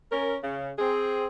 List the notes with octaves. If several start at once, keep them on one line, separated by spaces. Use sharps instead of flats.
C#4 A#4
C#3
C4 G#4